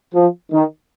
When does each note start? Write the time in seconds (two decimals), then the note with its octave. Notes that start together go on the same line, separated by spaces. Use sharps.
0.14 F3
0.52 D#3